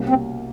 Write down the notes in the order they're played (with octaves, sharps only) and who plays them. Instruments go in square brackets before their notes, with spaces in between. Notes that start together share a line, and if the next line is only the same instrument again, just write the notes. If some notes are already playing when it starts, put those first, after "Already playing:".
Already playing: [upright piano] C2 B2 G3 A#3 C#4
[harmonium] C4